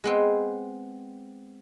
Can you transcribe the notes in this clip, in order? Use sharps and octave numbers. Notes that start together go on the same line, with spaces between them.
G#3 B3 C4